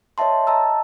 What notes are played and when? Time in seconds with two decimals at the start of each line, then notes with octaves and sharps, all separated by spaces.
0.18 C#5 D#5 E5 A5 C6
0.47 D#5 A5 A#5 E6